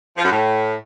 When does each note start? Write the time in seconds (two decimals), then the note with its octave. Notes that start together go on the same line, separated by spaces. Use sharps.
0.17 F3
0.24 F#2
0.31 A2